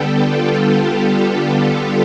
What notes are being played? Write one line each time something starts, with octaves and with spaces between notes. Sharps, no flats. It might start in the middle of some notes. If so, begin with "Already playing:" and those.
Already playing: D3 G3 B3 G4 A4
F4
F4
G4